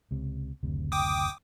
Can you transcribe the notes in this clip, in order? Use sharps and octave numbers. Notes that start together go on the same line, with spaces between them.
C#2 C3
F#1 D2 C3
G5 D6 D#6